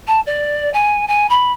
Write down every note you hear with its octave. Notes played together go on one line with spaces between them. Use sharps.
A5
D5
G#5
G#5
B5